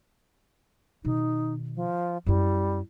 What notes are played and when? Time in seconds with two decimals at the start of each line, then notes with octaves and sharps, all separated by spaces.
1.05 B2 D#3 D#4
1.75 F3
2.26 F#2 G3 E4